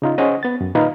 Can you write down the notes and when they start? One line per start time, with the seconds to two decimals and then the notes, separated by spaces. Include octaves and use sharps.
0.02 C#3 D#4 F4
0.18 C#4 G#4 C5 D#5 F#5 D#6
0.43 B3 A6
0.61 F#2
0.75 A#2 D#3 D#4 B4 F5